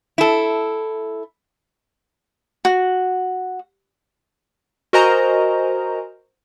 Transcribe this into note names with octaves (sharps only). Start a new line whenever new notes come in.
E4 A4
F#4
F#4 A#4 C5 D#5 G#5 A#5